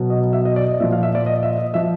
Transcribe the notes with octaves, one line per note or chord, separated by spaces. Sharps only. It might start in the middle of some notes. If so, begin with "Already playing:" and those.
Already playing: B2 F#3
D#5
E5
D#5
D5
D#5
A#2 F3 E5
F5
E5
D5
D#5
E5
D#5
F3 E5